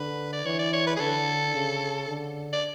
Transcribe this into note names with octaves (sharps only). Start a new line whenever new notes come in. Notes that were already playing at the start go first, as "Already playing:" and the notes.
Already playing: D3 B4
D5
E3 C#5
D5
C#5
B4
G#4
D3 A4
C#3
D3
D5